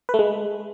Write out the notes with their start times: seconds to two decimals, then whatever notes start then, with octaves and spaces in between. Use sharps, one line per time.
0.09 B4
0.14 A3
0.19 G#3